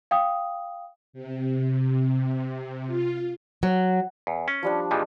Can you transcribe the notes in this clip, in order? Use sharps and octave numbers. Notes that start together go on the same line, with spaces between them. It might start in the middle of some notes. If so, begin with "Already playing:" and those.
F5 G5 D#6
C3
F4
F#3
E2
C#4
F3 G3 D4
A#2 E3 F3 G#3